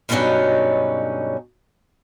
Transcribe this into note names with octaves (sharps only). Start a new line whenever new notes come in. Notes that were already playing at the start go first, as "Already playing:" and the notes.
G2 B2 D3 F#3 C#4 D#4